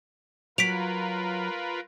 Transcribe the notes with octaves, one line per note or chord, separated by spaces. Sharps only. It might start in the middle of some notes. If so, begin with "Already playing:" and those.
F#3 F4 A#4 B4 B6 D7 F7